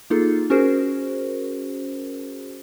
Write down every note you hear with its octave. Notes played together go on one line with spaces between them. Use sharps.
A#3 D#4 F4 G#4 A4
C#4 F#4 G#4 A#4 C5